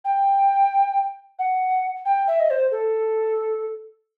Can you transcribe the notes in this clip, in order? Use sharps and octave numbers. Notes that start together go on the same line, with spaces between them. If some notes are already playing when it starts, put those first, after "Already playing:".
G5
F#5
G5
E5
D#5
C5
A4